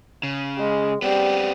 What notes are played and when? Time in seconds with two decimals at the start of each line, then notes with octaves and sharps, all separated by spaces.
0.23 C#3
0.59 G#3
1.02 G3 B3 C4